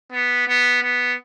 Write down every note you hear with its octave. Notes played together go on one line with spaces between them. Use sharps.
B3
B3
B3